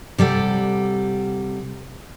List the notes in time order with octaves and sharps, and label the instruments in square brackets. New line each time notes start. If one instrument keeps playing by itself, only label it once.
[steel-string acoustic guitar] C3 G3 A4 F#5